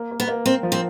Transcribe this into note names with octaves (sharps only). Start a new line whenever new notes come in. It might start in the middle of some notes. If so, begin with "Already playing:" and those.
Already playing: A#3
A#3
B3
A#3
A#3 C4
F3
C4